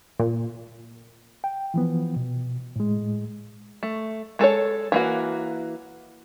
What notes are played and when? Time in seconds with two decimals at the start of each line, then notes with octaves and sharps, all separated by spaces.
0.19 A#2
1.44 G5
1.74 E3 F3 B3
2.16 B2
2.76 A2 G#3
3.83 A3
4.39 G#3 A4 A#4 C#5
4.92 E3 A#3 F#4